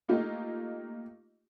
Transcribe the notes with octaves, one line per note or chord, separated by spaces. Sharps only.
A3 A#3 D#4 F4 G4